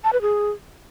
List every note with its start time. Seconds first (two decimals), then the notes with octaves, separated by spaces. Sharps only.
0.04 A5
0.13 B4
0.22 G#4